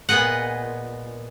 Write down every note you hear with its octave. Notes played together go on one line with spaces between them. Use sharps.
A#2 B3 G#4 D#5 F#5